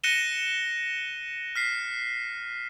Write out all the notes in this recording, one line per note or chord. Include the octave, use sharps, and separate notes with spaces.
F#6 A#6 C#7 D#7 E7 G7
F6 B6 C7